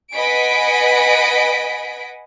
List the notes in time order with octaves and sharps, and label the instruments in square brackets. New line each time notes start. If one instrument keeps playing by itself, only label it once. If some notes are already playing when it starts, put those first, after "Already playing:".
[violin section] B4 D#5 F#5 G#5 B6 D7